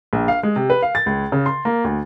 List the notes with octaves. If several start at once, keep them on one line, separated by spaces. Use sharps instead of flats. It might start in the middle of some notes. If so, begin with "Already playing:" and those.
A#1
F5
G#3
C3
B4
F5
A6
C#2
C#3
C6
A#3
D2